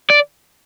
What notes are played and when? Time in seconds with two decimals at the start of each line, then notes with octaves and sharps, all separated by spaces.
0.10 D5